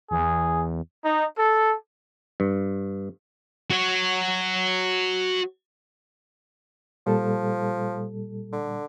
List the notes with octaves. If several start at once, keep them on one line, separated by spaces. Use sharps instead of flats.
E2 G#4
D#4
A4
G2
F#4 C#5
A#2 F3 G3 A4
D3